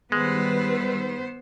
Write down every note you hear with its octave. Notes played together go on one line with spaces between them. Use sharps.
D#3 G3 G#3 B3 B4 C5 E6